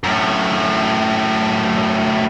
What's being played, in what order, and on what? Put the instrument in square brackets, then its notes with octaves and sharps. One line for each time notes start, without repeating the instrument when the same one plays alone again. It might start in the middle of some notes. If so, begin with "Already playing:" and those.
[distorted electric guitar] F#2 A2